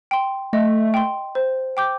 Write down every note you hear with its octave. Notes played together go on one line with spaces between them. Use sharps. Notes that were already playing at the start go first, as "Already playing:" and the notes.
G5 C6
A3 D#5
G5 C6
C5
G5 D6 G6